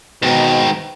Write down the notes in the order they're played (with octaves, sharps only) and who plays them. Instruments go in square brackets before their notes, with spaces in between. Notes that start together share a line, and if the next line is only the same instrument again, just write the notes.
[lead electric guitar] G#2 D#3 [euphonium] B2